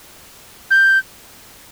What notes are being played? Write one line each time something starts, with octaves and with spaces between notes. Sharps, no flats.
G6